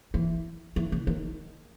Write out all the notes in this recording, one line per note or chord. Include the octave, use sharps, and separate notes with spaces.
E3
E3
C#3
D#3